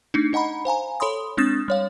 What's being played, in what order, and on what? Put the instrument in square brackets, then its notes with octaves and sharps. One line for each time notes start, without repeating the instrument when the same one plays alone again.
[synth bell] A3 D4 D#4
D#4 D#5 F#5 A#5 B5
C5 F5 G#5 A#5
A4 C#5 B5 C6 D#6
G#3 C4 D4 D#6 A6 E7
G3 C#5 F5